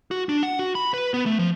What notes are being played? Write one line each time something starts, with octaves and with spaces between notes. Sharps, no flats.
F#4
D4
F#5
F#4
B5
B4
B3
A3
F3